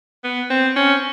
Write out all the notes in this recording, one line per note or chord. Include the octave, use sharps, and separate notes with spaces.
B3
C4
C#4